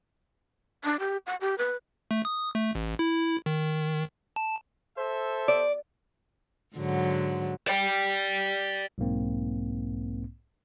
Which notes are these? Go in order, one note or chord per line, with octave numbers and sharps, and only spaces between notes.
D4
G4
F#5
G4
B4
A3
D#6
A3
A1
E4
D#3
A5
A4 C5 E5
D5
G#2 D3 F#3
D5 G5
B1 G#2 A#3 C4